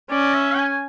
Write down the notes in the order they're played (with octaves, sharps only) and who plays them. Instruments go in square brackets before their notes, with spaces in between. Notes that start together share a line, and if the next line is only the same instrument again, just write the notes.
[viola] C#4 [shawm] D5
[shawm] E5
G#5